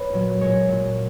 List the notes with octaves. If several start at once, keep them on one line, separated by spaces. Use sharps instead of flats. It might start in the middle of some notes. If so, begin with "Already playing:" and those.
Already playing: B4 C#5
A#2 F#3
A#2 G#3 C#5
A#2 F#3